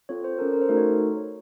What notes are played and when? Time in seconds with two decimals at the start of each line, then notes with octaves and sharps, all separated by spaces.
0.09 C4 F4 A4 C#5
0.24 C5
0.38 C#4 A4 A#4
0.53 A#4
0.62 C5
0.69 A3 D#4 F#4 A4 A#4
0.77 C#5